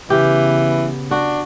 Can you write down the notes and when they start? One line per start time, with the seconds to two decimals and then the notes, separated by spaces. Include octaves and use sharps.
0.10 C#3 E3 B3 G4
1.11 D4 F#4